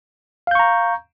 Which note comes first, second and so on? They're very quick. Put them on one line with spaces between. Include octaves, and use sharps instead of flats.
F5 G6 C#6 A#5